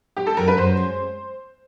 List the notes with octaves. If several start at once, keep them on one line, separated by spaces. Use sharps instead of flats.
G#3 G4
A4
F#2 A#4
B4
F#2 C5
G#3